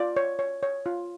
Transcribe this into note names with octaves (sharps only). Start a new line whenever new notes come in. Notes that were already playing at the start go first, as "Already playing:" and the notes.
Already playing: F4 D5
C#5
C#5
C#5
F4